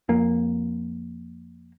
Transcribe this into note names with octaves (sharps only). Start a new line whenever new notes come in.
F2 A#3